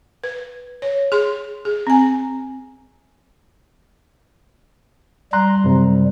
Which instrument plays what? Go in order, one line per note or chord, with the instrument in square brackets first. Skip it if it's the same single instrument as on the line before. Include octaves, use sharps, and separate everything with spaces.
[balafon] B4
C#5
G#4 C6
G#4
C4 G#5
[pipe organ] G3 [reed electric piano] A#5 C6 F#6
[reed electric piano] F#2 C3